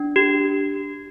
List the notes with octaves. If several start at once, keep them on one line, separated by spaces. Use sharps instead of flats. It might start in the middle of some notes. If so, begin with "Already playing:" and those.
Already playing: D4
G4